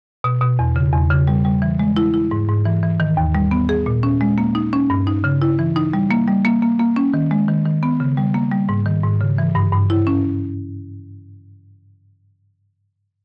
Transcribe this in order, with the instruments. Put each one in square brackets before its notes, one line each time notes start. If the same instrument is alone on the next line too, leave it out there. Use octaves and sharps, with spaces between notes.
[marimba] B2
B2
E2
C#3
E2
C#3
G3
G3
E3
G#3
E4
E4
G#2
G#2
E3
E3
D#3
D#2
G3
B3
G#4
A#2
C#4
G#3
A#3
D#4
C#4
G2
D#4
C#3
E4
E3
D#4
G3
A#3
G3
A#3
A#3
A#3
C#4
D#3
G#3
D#3
D#3
B3
C#3
G3
A#3
G3
G#2
D#3
G#2
C#3
E3
G2
G2
E4
C#4